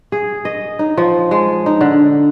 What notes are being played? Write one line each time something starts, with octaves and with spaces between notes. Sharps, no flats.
G#4
D#5
D#4
F3
G#3
D#4
D3